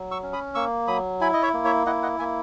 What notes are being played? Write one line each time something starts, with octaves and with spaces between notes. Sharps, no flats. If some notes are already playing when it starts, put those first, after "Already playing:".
Already playing: F#3
C#6 E6
C#4
B5 D#6
A#3 C#6 E6
F#3 B5 D#6
E4 G#5 B5
D#5
C#5 E5
A#3
C#5 E5
E4 D#5 F#5
D#5 F#5
A#3 E5 G#5